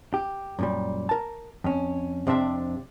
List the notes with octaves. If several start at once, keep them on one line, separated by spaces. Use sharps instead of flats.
G4
F#2 A#2 G3
A#4 A5
F2 C#4
F2 C3 C4 D4 E5